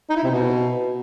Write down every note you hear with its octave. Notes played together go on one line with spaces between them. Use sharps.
D#4
E4
C3
B2